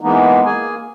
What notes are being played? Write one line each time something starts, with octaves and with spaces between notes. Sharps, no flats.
E3 G#3 A#3 B3 D#4
A#3 G#4 G#5